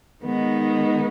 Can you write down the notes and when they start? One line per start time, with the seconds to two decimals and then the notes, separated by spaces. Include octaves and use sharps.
0.23 D#3 G#3 B3 D#4